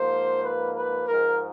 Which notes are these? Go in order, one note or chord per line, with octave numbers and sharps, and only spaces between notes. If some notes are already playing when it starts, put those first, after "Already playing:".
Already playing: G#2 F3 A#3 C5
B4
B4
G#2 F3 G#3 A#4